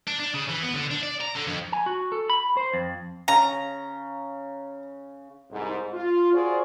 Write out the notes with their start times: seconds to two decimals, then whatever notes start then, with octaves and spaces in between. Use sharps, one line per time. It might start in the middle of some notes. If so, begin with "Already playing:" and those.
0.07 D4
0.19 D4
0.34 C#3
0.49 E3
0.63 B3
0.74 D3
0.91 D4
1.03 D5
1.21 A#5
1.36 D3
1.47 F2
1.72 G#5
1.86 F#4
2.12 A4
2.30 B5
2.57 C5
2.74 F2
3.28 C#3 A#5
5.51 C2 G#2
5.93 F4
6.33 F4 F#4 G#4 C5 D5